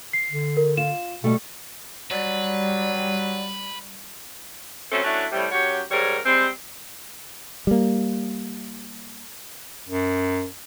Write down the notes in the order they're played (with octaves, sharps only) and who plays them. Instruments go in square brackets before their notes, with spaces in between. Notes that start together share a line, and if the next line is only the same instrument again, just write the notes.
[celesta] C7
[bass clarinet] D3
[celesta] A#4
[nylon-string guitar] F4 [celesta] E7
[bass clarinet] B2 [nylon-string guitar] G3 A3
[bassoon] F#3 [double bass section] G3 [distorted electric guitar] B4 [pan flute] D5
[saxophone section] F#3 A3 C4 C#4 A4
A3 C#4 D4 E4 F#4
A2 C3 G3
F#2 F#4 G4 C#5
G#2 D#3 G3 A#4 C#5
G3 G#3 C4
[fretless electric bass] G3 A#3
[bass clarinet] F#2